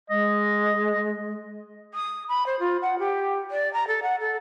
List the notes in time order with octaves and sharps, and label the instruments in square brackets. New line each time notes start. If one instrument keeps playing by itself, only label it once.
[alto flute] G#3 [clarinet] D#5
[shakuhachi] D#6
B5
C5
F4
F#5
G4
D5
A#5
A4
F#5
A4